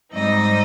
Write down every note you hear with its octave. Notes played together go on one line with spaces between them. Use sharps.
G#2 G3 C4 D#4 D#5